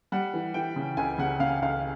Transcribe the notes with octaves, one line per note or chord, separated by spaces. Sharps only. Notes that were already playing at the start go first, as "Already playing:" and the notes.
G3 F#5
E3
E3 G5
C#3
C#2 G#5
C#3 F#5
C#3 F5
C#2 F5